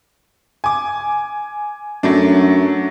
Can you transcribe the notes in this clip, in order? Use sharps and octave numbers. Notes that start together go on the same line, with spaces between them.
G#5 D6
F#2 F#3 A3 D4